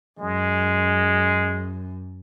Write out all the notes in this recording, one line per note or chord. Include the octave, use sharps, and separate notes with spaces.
F#2 G#3